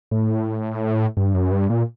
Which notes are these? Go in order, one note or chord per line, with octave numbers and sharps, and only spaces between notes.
A2
G2
F#2
G2
A#2